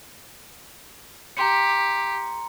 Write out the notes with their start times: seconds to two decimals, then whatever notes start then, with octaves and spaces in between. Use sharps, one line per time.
1.37 G4 A#5 C6 C#7